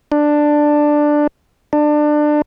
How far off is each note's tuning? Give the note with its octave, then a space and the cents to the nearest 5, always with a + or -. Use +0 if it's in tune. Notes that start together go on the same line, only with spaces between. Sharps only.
D4 +10
D4 +25